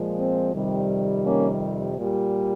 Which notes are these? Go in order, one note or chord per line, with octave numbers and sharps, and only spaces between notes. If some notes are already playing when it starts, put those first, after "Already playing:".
Already playing: A#2 F3 G#3
C4
F2 C3 D#3 G3
A#3 C#4
A#2 G3